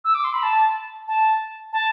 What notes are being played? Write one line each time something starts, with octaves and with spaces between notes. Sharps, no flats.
E6
D6
C6
B5
A5
A5
A5